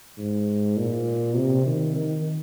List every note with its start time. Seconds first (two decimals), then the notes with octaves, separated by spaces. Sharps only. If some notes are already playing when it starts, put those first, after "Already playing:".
0.18 G#2
0.77 A#2
1.36 C3
1.66 D#3
1.95 D#3